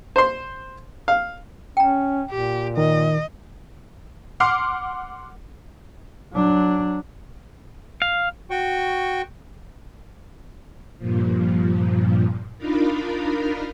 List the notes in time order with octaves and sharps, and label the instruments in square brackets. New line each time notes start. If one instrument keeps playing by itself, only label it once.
[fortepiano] C5 C6
F5
[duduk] C#4 [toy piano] G5 A#5
[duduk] A#2 [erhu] G4
[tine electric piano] D#3 [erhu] D#5
[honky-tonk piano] F#5 C6 D6 F6 C7
[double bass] F#3 D4
[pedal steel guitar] F5
[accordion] F#4 G5 C#6
[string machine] G2 A#2 F3
D4 D#4 F4 A#4 F5 B5